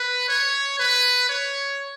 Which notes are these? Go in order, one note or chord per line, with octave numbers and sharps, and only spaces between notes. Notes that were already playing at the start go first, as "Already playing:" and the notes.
Already playing: B4
C#5
B4
C#5